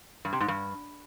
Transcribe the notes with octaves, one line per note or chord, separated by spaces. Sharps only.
G2
C3
G#2
G2